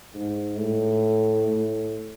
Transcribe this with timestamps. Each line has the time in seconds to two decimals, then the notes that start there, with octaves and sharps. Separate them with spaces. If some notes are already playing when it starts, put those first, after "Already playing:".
0.14 G#2
0.57 A2
1.47 A2